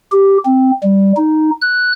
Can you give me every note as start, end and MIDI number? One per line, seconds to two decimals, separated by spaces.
0.12 0.38 67
0.45 0.71 60
0.83 1.13 55
1.16 1.50 63
1.62 1.93 90